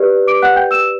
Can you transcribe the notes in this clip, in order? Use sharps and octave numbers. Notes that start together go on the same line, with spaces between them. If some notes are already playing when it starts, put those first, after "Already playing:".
Already playing: G4 B4 D5
D6 D7
F#5 F#6
G5 G6
E6 E7